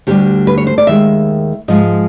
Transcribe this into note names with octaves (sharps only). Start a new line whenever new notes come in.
D2 D3 G3 G4
B4
C#5
C5
D5
D#2 D#3 G#3 E5
G#2 F3 G#3 D#5